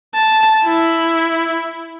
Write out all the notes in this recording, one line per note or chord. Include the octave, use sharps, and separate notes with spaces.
A5
E4